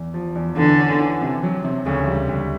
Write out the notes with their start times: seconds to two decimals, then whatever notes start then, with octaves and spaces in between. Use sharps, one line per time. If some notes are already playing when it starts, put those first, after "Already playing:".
Already playing: E2
0.14 F3
0.35 E2
0.57 D3 E3
0.78 C#4
1.00 E3
1.22 C3
1.43 F#3
1.65 C3
1.86 D2 C#3
2.08 G3
2.29 D2